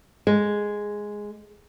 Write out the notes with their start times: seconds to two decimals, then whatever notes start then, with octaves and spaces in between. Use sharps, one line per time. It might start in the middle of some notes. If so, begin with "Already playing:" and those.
0.27 G#3